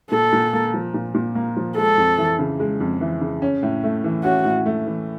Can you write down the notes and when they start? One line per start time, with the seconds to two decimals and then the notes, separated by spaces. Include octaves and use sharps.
0.11 A#2 A4
0.32 A#2
0.53 A#3
0.74 F3
0.94 A#2
1.14 A#2
1.35 A#3
1.56 F3
1.76 G#3 A4
1.98 F2
2.18 E3
2.39 C#3
2.60 G#3
2.80 F2
3.01 E3
3.21 C#3
3.42 C#4
3.62 A2
3.83 A3
4.04 E3
4.24 C#4 F#4
4.45 A2
4.66 A3
4.87 E3